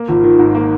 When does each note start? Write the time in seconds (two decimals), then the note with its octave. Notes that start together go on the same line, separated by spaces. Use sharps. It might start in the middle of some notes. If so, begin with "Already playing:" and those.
Already playing: A#3
0.08 G#1 F4
0.23 D#3 F4
0.34 D#4
0.39 G#2
0.51 A#3 D#4